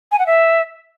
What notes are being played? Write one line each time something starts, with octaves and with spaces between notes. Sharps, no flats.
G#5
F#5
E5